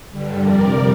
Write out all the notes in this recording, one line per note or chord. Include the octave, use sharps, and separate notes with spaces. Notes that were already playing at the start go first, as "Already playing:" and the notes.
G2 D3 G3
F2 C3 G3 A#4 D5